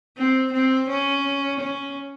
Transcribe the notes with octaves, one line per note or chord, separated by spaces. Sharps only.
C4
C4
C#4
C#4